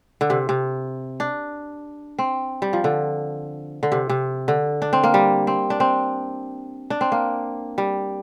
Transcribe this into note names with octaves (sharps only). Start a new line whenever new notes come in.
D3
C3
C3
D4
C4
G3
F3
D3
D3
C3
C3
D3
D4
C4
A#3
G3
C4
D4
C4
D4
C4
A#3
G3